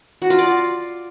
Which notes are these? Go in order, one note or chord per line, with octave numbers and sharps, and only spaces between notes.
F#4
F4
D5